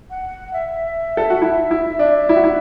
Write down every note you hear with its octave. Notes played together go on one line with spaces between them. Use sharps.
F#5
E5
A4
F#4
E4
E4
D4
E4 E5
F#4
E4